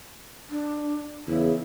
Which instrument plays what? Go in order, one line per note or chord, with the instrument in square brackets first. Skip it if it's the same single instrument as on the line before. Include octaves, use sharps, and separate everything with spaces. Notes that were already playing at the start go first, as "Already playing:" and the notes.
[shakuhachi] D4
[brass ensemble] E2 C#3 [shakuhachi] E4